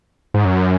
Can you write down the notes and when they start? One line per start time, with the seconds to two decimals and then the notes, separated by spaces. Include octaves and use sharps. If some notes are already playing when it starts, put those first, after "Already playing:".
0.34 G#2
0.45 F#2